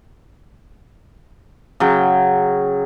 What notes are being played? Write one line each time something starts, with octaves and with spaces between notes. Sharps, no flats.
C#3 F#3 G5